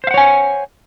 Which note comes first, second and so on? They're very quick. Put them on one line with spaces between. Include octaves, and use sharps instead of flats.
C5 F5 F#5 C#5 G#5